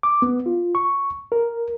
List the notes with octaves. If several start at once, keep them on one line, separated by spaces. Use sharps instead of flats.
D6
B3
F4
C#6
A#4